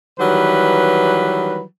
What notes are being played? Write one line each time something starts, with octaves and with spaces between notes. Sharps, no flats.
D#3 E3 F#3 G3 B4